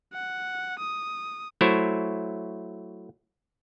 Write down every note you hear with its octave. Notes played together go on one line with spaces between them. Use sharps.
F#5
D#6
F#3 A3 E4 C5 C#5